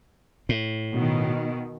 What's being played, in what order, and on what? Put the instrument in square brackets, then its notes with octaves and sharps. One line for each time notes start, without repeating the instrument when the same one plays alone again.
[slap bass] A2
[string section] B2 D#3